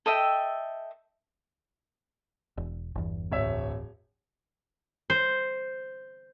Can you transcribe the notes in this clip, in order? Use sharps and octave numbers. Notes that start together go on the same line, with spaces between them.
A4 D#5 E5 G5
E1
G1 E2
D1 C#5 E5
C5